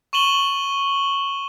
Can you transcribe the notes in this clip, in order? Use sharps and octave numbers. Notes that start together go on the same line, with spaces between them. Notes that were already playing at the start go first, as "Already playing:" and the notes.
C#6 D#7 E7 F#7 G7